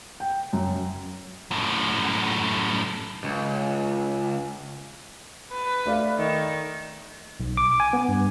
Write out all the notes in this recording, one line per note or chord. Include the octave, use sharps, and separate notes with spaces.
G5
F#2
F#2 A2
C#2
B4
A3 D5 F5
D#3
B1
D6
G#5
B3
G2